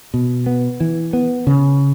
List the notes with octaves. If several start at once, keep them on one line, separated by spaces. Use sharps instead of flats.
B2
B3
E3
B3
C#3